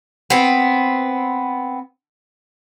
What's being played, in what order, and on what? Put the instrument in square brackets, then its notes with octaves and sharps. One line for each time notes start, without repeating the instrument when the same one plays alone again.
[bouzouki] B3 C4